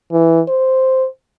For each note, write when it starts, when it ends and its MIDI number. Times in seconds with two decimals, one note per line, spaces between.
0.12 0.41 52
0.48 1.07 72